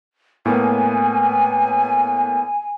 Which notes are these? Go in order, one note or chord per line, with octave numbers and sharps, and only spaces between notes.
A2 A#3 B3 G#5